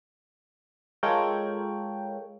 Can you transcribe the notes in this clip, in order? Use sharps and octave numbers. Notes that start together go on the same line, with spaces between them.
G#3 F4 A4 A#4 C#5 G5